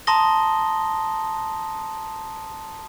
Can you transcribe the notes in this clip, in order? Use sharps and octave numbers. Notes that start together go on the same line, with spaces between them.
A5 A#5 C6 D#6 A#6 G7